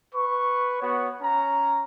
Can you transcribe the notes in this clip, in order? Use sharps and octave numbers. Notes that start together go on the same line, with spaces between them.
B4 C#6
B3 F#4 C#5
C#4 A#5